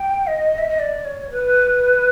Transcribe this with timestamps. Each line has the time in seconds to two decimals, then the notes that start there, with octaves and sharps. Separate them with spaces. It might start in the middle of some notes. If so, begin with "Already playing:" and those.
Already playing: G5
0.27 D#5
0.58 E5
0.69 D#5
0.79 D5
1.05 C#5
1.31 B4